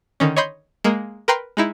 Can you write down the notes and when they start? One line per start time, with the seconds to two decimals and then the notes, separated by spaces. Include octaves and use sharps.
0.20 D3 D#3 C#4
0.36 C#5 D#5 B5 C6 G6
0.84 G#3 A#3
1.28 A#4 B4 G5 A#5 C6
1.57 G#3 D#4 E4